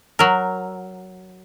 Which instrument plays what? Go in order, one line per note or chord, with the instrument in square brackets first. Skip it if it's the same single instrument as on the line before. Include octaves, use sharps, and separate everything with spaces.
[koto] F#3 A#4